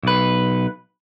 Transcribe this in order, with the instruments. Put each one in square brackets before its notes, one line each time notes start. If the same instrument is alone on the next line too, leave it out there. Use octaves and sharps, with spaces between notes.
[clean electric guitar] B1 B4